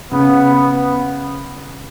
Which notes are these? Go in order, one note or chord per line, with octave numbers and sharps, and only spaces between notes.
C#3 B3
B3